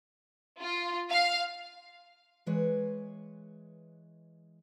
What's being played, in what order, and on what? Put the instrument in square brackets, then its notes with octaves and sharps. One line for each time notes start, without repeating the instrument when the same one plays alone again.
[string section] F4
F5
[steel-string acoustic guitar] E3 G#3 B4 C#5